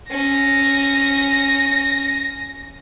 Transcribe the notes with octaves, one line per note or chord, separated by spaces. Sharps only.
C#4 A#6